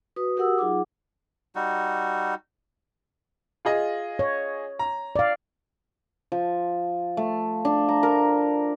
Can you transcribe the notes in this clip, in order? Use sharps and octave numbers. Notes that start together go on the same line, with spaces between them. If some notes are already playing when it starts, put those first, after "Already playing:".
F#4 B4 D#6
F#4 G4 A#4 F#5 D#6 E6
F#3 D#4 F4 G#4 F#5 D6
G3 D#4 F#4
F4 G#4 D#5
C#5
A#5
D5 F5
F3
A3
D4
A#5
A#4